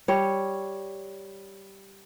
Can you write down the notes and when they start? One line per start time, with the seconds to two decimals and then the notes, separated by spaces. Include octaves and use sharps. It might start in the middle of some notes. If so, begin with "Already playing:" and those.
0.08 G3 C#5